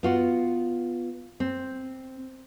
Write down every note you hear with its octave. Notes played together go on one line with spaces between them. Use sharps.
B3 F4 F#4
C4